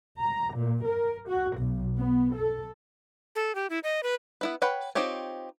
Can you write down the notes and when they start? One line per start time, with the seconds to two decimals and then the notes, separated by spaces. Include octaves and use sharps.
0.21 A#5
0.57 A#2
0.89 A#4
1.29 F#4
1.59 B1
1.96 B3
2.34 A4
3.36 A4
3.55 G4
3.70 E4
3.83 D#5
4.03 B4
4.41 B3 E4 B4
4.62 B4 C#5 F#5 G5 B5
4.95 C4 D#4 F4 G4 C#5